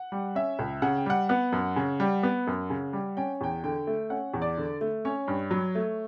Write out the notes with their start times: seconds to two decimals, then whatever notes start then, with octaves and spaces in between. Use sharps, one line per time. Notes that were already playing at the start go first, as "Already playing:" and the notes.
Already playing: F#5
0.12 G3
0.35 C#4 E5
0.59 C#2
0.82 C#3 F#5
0.97 G5
1.06 G3 F#5
1.29 B3 F#5
1.52 F#2
1.76 C#3
2.00 G3
2.23 B3
2.47 F#2
2.70 C#3
2.93 G3
3.17 C#4 G5
3.41 E2 G5
3.64 D3 G5
3.87 A3
4.10 C#4 F#5
4.34 E2
4.42 D5
4.57 D3
4.81 A3
5.05 C#4 C#5
5.28 G2
5.51 F#3
5.75 A3